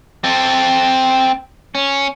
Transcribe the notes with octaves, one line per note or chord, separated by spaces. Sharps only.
C4 A4
C#4